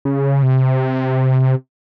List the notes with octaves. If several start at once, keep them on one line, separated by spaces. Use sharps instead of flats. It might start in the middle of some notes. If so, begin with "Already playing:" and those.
C#3
C3